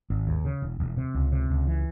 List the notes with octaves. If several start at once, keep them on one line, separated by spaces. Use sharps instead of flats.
G#1
D#2
C#3
E1
E1
C3
C#2
C3
C#2
E3